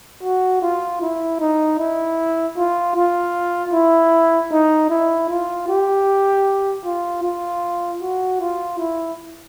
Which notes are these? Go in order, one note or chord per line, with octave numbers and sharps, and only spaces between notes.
F#4
F4
E4
D#4
E4
F4
F4
E4
D#4
E4
F4
G4
F4
F4
F#4
F4
E4